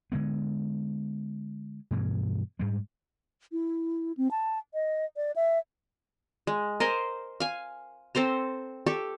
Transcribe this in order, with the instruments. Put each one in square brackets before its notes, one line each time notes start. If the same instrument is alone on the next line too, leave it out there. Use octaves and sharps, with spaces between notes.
[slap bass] D3 E3 G#3 B3
G2 B2 E3
G#2 G3 G#3
[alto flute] E4
C4
A5
D#5
D5
E5
[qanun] G#3
A#4 C5 D#5 G#5
F5 G#5
C4 A4 C5 A#5
G4 A4 C#6